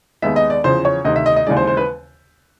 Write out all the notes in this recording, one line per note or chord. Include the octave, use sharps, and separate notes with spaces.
D#2 D#3 G#3 B3 D#4 E5
D#5
D5
E2 C#3 F3 C5
C#5
D2 C3 D#3 D#5
E5
D#5
D#5
D#2 C#3 E3 G#3 D5
C5
C5
B4